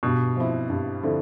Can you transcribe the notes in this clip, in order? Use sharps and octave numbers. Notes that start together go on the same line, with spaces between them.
G2 B2
F3 C4 E4
G2
D3 F3 C4 E4